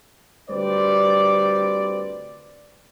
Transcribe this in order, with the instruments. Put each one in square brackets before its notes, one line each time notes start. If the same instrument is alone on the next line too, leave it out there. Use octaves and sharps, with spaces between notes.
[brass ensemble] D2 G3 C4 B4 C5 D5